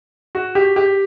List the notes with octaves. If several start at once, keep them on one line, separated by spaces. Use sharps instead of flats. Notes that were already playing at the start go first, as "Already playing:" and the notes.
F#4
G4
G4